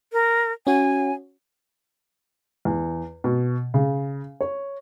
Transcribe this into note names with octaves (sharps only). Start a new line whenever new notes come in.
A#4
C#4 F#4 G#5
E2
B2
C#3
C#5